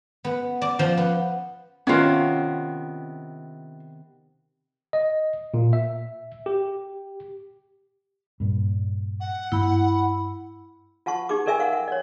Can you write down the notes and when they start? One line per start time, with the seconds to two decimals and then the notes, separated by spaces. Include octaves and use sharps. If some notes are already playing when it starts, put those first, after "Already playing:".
0.25 B3
0.62 D5
0.79 F3
0.97 B3
1.87 C3 D#3 B3 C#4 F4
4.93 D#5
5.54 A#2
5.73 E5
6.46 G4
8.40 G2 A#2
9.20 F#5
9.52 G2 A#3 E4 B5
11.06 F4 F#5 A5 C#6
11.29 D#4 G4 G#4 D6
11.46 A4 A#4 D5 E5 G5 G#5
11.59 A#4 F5 F#5
11.73 F#5
11.88 C#5 D5